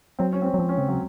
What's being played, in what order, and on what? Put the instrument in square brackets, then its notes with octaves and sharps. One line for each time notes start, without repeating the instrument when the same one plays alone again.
[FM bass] F#3 [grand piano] C4
[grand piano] C#4
C4
C#4
[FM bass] F#3
[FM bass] F3 [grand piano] C4
[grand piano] C#4
[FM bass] C#3 [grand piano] C4
[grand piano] F#3